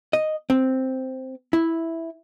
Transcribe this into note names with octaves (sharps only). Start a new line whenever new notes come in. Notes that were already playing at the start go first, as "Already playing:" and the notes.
D#5
C4
E4